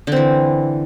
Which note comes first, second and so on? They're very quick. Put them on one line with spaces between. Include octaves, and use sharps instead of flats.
D3 C4 E3